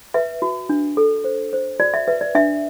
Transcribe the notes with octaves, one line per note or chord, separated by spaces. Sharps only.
B4 E5
F#4
D4
A4
C5
C5
F#4 D5
E5
B4 E5
D5
D4 E5